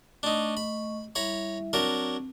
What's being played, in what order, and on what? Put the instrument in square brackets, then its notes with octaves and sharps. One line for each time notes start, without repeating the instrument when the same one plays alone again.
[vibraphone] A3 D#5 C#6 [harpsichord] D4 D#4
[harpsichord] B5
[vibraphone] G3 E4 E5 [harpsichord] C#5 A#5 B5
[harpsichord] F#3 D4 A#4 [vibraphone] C4